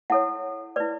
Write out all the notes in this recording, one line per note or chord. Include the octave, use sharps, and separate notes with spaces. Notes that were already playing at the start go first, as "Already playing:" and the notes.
E4 A4 C#5 F#5
E4 B4 D5